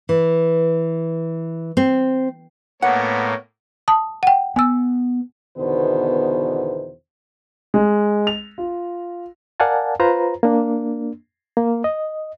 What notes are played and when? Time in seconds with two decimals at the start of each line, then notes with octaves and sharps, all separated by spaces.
0.09 E3
1.77 C4
2.82 A2 A#3 B3 C#5 F#5
3.88 A5 D#6
4.23 F#5 G5
4.56 B3 G#5 E6
5.58 E2 B2 D3 D#3 B3 C5
7.74 G#3
8.27 F7
8.58 F4
9.60 A#4 D5 F5 F#5 G#5 A5
10.00 F4 B4 C5 A#5
10.43 A#3 D4
11.57 A#3
11.84 D#5